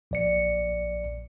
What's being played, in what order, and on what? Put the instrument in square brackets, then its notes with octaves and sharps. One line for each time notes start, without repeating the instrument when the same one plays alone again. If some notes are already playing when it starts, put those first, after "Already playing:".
[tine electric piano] A#1 D5 C#7